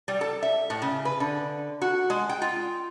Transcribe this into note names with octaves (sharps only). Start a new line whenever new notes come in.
G3
A4
E5
A2
C#3
B4
D3
F#4
G#3
G5
F4